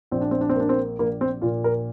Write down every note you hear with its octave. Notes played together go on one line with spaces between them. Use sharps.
A#1 C4
D4
C4
D4
C4
A#3 D4
C4
A#1 A#3
C4
A#2 F4
A#4